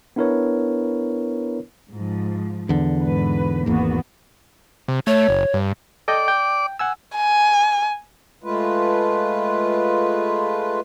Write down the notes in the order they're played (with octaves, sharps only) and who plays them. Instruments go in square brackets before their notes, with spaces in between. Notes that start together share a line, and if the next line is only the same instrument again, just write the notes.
[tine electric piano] B3 D4 E4 A#4 B4 C#5
[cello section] G#2 F3
[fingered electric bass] E2 D3
[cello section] G#2 B4
[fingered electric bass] G#1 E2 [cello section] A#3 B3 F#4
[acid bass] C3
[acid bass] A3 [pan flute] C#5
[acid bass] F#1
G2
[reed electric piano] A4 D#5 G5 [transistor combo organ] D5 D6
[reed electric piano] G5
F#5 G#5 E6
[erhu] G#5
[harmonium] G#3 A3 F4 B4